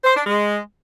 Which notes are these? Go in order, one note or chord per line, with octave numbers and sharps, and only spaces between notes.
C5
D4
G#3